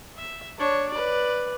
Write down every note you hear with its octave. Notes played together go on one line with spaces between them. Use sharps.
E5
D4 C#5
B4 D5